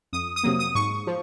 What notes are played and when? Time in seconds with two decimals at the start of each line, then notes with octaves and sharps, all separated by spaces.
0.13 F2 D#6
0.36 D#6
0.44 C3 F#3 A#3
0.59 D#6
0.75 G#2 C#6
1.07 F3